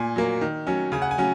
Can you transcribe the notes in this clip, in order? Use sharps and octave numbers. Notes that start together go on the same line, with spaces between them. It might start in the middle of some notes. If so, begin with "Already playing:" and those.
Already playing: A#2 G#5
F#3 A#3
D#3
F#3 C#4
C#3 G#5
F#5
G#5
F#3 C#4